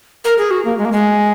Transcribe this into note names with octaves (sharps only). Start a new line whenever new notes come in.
A#4
G#4
F#4
A#3
G#3
A#3
G#3